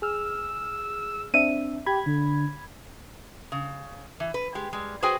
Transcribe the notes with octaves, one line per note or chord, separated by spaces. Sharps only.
G#4 E6 F6
C4 D4 E5 D#7
G4 B5 G#6
D3
C#3
E3
B4
G#3 G4
G3 G#3
F#4 G#4 B4 C5 G5 G#5